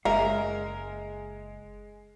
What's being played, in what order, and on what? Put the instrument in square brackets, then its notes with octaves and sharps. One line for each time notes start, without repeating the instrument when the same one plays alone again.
[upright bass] F#1 [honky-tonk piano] G#3 [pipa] A#4 [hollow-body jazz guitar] E5 F5